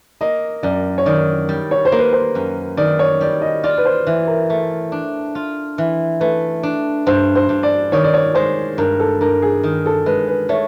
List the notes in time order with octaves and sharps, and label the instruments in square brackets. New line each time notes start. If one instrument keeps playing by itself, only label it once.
[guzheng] A#3 [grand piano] D#5
[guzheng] F#2 [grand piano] D5
[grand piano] C#5
[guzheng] D#3 [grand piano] D5
[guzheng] G3
[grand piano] C#5
C5
[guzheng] A#3
[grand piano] B4
C5
[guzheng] F#2
[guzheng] D#3 [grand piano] D5
[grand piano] C#5
[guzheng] G3 [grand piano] D5
[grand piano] D#5
[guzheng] F4 [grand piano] D5
[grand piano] B4
C5
[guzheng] E3 [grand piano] B4
[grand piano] A#4
[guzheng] A3
D4
F4
E3
[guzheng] A3 [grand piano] B4
[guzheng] D4
[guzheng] G2 [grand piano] C5
[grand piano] C5
[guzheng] G2
[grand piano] D5
[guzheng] D#3 [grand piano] C#5
[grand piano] D5
C#5
[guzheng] G#3 [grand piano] C5
[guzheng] G2 [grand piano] A#4
[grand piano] A4
[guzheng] G2 [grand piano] A#4
[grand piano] G#4
[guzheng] D#3
[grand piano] A4
[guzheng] G#3 [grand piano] B4
[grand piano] B4
[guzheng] A3 [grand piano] C#5